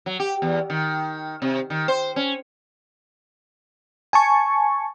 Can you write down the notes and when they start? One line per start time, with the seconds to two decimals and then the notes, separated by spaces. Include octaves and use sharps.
0.06 F#3
0.20 G4
0.42 E2
0.70 D#3
1.42 C3
1.70 D#3
1.88 C5
2.16 C#4
4.13 G#5 A5 C#6